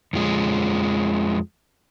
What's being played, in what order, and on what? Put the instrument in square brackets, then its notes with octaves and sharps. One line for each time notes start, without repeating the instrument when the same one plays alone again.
[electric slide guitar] F2 F3 G#3